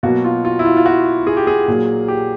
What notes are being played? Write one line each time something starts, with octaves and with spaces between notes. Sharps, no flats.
B2 F#3 A#3 F#4
F4
F4
E4
F4
F4
F#4
G#4
G4
G#4
A#2 F#3 A#3
G4